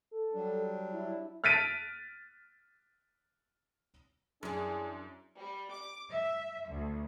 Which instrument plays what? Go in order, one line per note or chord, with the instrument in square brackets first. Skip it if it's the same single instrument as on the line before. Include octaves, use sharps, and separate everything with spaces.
[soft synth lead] A4
[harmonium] F#3 G3 D4
[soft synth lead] E4
[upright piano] F6 F#6 A6 B6 D7 D#7
[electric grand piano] F#2 [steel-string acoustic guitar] E3 G3 [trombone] D4 [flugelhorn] G#4
[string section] G3
D6
E5
D2